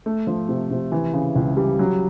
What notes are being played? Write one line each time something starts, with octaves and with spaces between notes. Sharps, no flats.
A3
F3
C3
C3
E3
C#3
C#2
G3
F#3